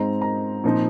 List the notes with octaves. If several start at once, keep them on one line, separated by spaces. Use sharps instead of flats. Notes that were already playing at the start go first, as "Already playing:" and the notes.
Already playing: G#2 G#3 C4 D#4 A#5
A#5
A#2 F3 C4 D#4